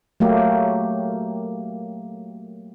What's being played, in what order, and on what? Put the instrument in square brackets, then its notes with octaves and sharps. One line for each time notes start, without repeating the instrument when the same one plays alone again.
[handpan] F#3 A3 A#3 G4